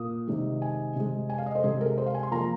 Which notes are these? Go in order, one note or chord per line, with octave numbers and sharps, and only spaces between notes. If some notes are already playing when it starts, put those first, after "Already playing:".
Already playing: A#2 A#3 D#6
C3 D#3 G#3
G#5
C3 G#3
G#5
F5
D#5
C5
C3 G#3 G#4
A#4
C5
F5
G#5
C6
F3 A#3 A#5